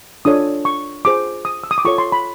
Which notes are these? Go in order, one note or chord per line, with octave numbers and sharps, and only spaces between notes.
D4 F4 A4 C#5 D#6
C#6
F4 G#4 C5 D6
D#6
E6
D#6
D6
F4 A4 C#5 C#6
C6
B5